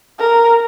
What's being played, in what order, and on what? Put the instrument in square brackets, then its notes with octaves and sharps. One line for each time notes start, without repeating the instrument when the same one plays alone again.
[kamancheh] A#4